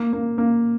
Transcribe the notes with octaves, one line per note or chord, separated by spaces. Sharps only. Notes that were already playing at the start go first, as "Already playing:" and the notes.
Already playing: A#3
A#3
A#3